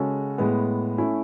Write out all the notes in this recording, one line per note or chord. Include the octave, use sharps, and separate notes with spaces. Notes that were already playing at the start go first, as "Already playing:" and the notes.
Already playing: C#3 G#3 C#4 F#4 A4
A2 G#3 B3
A3 C#4 E4